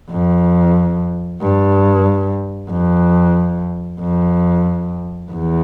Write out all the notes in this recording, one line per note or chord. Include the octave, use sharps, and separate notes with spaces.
F2
G2
F2
F2
E2